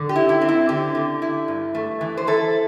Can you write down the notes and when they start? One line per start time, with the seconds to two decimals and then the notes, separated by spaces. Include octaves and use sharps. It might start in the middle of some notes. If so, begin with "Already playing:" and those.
Already playing: D3
0.09 G4
0.16 E4
0.29 E4
0.41 C4
0.49 E4
0.69 D3 G4
0.95 D3
1.22 E4
1.48 G2
1.74 A3
2.01 E3
2.17 C5
2.27 E4 A4